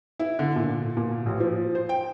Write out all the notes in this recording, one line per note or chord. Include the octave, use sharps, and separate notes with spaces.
E4
D3
A#2
A#2
A1
F3
C5
G5